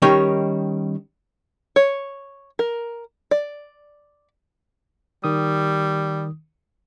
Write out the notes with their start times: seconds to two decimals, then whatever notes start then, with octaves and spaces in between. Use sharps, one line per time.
0.02 D#3 G3 C#4 D#4 A#4 C#5
1.76 C#5
2.59 A#4
3.31 D5
5.24 D#3 G3 D#6